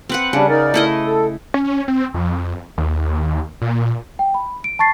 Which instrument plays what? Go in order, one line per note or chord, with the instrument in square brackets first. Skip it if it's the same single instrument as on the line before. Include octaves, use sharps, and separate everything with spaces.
[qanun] C4 B4 F#5
[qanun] C#3 [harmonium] G3 D4
[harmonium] D#4 A#4 D5
[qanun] A3 E4 D#5
[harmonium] A4
[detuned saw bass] C#4
C4
F2
D#2
A#2
[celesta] G5
B5
D7
A5 C#6 A6 C7